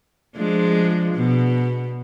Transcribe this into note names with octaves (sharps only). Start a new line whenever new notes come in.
F3 G#3 D4
B2